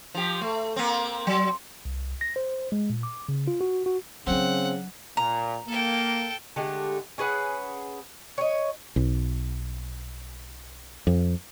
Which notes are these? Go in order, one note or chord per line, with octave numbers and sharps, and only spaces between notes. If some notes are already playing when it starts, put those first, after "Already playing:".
F3 G4
A3
A#3 C4
F#3
C2
A#6
C5
G#3
A#2
D6
C#3
F4
F#4
F#4
C#3 F#3 C4 D4 F#5
A#2 A#5
A#3 A4 G5
D3 G#3 A3 G4
C#4 G#4 B4 F#5
C#5 D#5
B1
F2